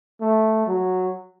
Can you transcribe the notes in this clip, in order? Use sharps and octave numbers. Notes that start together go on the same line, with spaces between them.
A3
F#3